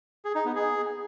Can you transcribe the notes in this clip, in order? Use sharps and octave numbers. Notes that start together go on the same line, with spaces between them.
G#4
D#4
B3
G#4